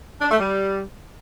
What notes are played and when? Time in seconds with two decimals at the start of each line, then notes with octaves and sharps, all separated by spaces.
0.21 D4
0.30 A3
0.39 G3